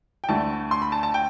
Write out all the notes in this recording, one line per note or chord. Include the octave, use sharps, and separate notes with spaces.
G5
D2 D3 A3 A5
C6
B5
A5
A5
G5